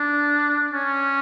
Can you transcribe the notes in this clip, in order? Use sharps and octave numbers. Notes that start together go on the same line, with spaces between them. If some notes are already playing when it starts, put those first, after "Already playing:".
Already playing: D4
C#4